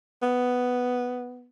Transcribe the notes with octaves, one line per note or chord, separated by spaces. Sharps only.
B3